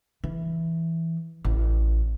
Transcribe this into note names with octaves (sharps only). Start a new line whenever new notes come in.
E3
A1